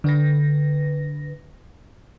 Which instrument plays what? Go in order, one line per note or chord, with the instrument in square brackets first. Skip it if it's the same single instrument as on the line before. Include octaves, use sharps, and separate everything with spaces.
[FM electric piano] D3 B4 A#6